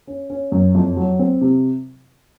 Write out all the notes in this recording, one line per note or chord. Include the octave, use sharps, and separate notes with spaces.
C#4
C#4
F#2
F2
F#3
C4
C3